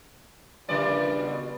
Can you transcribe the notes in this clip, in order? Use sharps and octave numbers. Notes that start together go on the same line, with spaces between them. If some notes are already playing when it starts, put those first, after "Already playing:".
A#2 C#3 F3 G3 B4 D5
B2